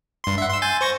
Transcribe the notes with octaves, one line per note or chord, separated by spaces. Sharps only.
G2 C6
E5 F#5
C6 E6
G#5 G6 A6
C5 C#6 A#6